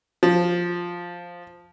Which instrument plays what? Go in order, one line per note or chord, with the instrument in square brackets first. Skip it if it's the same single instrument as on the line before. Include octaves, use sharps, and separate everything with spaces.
[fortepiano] F3